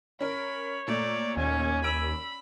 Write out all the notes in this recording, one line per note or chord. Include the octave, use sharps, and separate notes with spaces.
C#4 A#4 C#5 B5
A#2 A3 D5
D#2 C#4 G#5
B5 E6 D7